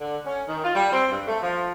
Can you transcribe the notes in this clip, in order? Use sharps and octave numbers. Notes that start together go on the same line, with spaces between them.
D3
C#4
D#3
F4
G3
C4
G2
A3
F3